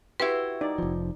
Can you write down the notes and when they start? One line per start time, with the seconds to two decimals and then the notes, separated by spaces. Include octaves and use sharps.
0.20 E4 F#4 G4 B4 C6
0.61 D#4 D5
0.78 F1 F3